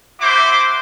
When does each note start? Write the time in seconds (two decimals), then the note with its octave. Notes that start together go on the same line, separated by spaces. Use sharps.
0.20 E4 F#4 C5 E5 D6